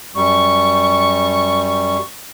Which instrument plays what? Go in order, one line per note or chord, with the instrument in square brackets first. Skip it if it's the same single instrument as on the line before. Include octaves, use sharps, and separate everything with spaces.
[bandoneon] F#2 G3 [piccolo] C#6